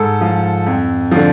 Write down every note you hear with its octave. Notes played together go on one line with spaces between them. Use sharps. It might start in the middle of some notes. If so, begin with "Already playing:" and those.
Already playing: G#2 A4
F3
F2
D3 F3